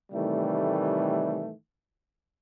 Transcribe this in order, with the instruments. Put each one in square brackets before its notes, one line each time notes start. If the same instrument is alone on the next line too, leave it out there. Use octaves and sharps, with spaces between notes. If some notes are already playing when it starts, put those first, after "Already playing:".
[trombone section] A2 C3 D#3 E3 G3 A3